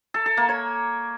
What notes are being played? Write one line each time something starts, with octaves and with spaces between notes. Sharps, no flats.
A4
A4
A#3
C#5